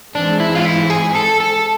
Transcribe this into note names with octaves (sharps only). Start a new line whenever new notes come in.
G#2 E3 G#3 C4 D4
E4
F4
E4
G#4
A4
A4